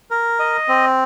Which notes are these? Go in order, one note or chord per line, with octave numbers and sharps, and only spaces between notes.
A#4
D#5
C4